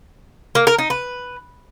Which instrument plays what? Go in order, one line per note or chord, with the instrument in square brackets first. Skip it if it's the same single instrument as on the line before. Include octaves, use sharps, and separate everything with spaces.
[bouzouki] A#3
A#4
D#4
B4